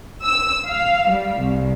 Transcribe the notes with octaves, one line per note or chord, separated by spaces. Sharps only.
E6
F5
G3
C2